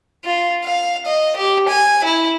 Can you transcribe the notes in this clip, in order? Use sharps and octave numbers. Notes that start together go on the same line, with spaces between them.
F4
F5
D#5
G4
G#5
E4